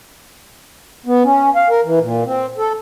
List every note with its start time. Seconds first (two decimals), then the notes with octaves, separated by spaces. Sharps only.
1.06 B3
1.24 C#4
1.56 F5
1.70 A#4
1.84 E3
2.01 A#2
2.25 C4
2.58 A4